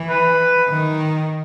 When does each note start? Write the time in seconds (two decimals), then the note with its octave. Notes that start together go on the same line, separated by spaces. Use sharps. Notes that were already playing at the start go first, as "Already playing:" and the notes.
Already playing: E3
0.10 B4
0.69 D#3